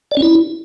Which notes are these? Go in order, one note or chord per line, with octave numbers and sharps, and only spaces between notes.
D5
C#4
E4